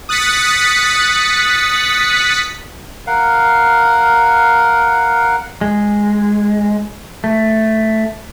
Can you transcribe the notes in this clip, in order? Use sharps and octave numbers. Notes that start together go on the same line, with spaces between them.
D#6 F#6 A6 B6 C#7
A#4 F5 F#5
G#3
A3